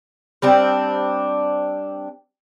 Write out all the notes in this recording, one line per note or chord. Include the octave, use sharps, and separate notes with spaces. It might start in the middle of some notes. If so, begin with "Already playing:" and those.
G3 C4 D4 D5